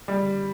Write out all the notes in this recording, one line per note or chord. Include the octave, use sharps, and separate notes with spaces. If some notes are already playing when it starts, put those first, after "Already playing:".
G3